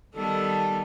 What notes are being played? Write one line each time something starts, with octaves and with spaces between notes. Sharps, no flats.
D#3 G3 B3 A4